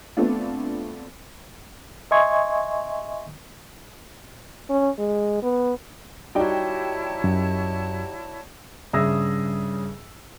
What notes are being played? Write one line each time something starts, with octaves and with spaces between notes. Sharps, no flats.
A3 B3 C4 D4 F4
D#5 E5 G#5 C6 C#6 G#6
C#4
G#3
B3
G3 D#4 E4 F#4 C#5 D5 G5 A5
F#2
G2 C#3 G#4 E5 E6 A#6